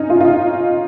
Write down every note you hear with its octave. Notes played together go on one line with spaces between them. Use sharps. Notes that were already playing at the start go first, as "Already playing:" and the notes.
Already playing: C#4 D#4
F4
F4
D#4